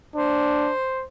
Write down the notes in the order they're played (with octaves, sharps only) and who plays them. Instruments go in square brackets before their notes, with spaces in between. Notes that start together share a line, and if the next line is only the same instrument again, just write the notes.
[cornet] D4 [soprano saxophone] C5